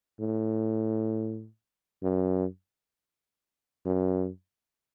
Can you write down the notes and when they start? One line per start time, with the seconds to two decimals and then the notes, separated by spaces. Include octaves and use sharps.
0.20 A2
2.03 F#2
3.85 F#2